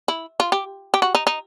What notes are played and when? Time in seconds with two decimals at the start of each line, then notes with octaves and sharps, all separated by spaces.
0.08 E4
0.40 F4
0.52 G4
0.94 G4
1.02 F#4
1.15 D#4
1.27 D#4